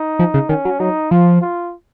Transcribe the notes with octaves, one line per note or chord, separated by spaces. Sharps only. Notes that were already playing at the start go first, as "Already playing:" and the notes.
Already playing: D#4
F3
C#3
D#3 C#4
F#3
F#3 D#4
F3 F4
F4